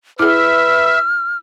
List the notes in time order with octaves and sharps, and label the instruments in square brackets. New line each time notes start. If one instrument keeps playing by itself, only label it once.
[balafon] E4 G#4 [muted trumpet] B4 [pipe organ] E5 [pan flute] F6